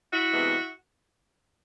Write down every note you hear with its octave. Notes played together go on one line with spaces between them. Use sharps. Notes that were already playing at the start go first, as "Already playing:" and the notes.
E4 F#4
C3 E3 G#3 B3